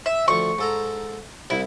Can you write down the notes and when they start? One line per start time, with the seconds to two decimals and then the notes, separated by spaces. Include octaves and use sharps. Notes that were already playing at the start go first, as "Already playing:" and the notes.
0.06 E5
0.28 D2 F3 C#6
0.59 G#2 A4 A#5
1.50 C2 E4